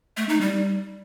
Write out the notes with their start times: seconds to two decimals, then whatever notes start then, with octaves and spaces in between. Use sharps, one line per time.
0.17 A3
0.29 D#4
0.41 G3